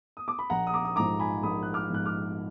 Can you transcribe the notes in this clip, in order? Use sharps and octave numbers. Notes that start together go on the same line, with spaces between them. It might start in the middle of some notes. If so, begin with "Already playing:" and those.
D#6
D6
B5
A#1 F#5 A#5
D#6
A#5 D6
D#6
G#2 F3 A#5 D6
G#5 B5
A#1 B5 D#6
F#6
D6 F6
G#2 F3 F#6
D6 F6